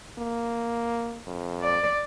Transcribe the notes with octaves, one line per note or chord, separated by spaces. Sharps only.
A#3
F2
D5